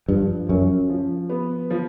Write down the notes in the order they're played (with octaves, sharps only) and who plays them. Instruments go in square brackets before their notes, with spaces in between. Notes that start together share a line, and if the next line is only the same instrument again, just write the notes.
[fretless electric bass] G2 [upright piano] F3
[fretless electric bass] F#2 [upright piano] C#4
[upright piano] F3
B3
F3